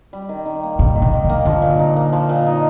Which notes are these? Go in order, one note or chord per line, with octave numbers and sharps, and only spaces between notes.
G3
D#3
D#3
A#3
A#2 G3
D#3
B2
D#3
D3
A#3
D3 F3
A#2
D#4
A#3
F3
A#2
D#4